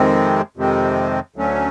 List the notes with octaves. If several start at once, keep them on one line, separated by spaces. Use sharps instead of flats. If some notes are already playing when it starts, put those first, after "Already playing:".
Already playing: F2 C3 D#3 G#3 C4
F2 C3 D#3 G#3 C4
D2 D3 F#3 A3 C#4